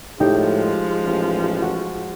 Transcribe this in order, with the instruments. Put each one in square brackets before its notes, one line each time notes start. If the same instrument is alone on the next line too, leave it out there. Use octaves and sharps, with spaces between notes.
[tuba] A2 [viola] F3 G#3 [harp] D#4 G4
[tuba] A1
[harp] F#4